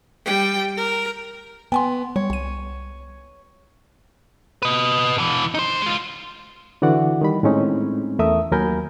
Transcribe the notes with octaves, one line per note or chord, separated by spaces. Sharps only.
G3 G5
A#4
B3 G5 G#5 C6
G3 C#5
C2 D#7
B4 D#5
B2 E3
D#4 C5
G#3 F4
D3 E3 F#4 D5 F#5
D#3 G3 B5
A2 G#3 C4 C#4 D#4
E2 A3 A#4 E5 D#6
D#2 F#3 A#4 G#5 B5 G6